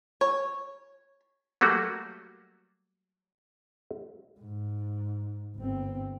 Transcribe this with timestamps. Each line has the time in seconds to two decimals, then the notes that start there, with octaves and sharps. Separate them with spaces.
0.21 C#5
1.61 F#3 G3 A3 A#3 F#4
4.40 G#2
5.56 G1 C4